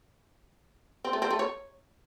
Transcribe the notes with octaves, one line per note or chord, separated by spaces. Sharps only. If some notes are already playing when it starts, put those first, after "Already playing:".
C4
A3
C4
A3
C#5